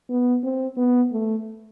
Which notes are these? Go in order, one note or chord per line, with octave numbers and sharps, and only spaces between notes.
B3
C4
B3
A3